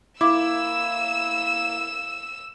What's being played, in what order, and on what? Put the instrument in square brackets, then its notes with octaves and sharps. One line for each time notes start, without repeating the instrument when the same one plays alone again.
[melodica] A#3 [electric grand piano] E4 [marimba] D6 [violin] E6 E7